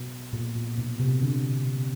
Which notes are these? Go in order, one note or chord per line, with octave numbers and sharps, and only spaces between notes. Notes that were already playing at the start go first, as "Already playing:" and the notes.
Already playing: B2
A#2
A#2
B2
C3
D3